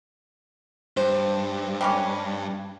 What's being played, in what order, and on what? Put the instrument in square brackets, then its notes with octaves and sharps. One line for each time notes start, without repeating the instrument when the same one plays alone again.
[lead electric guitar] G2 [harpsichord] C5
[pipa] G3 A#3 C#4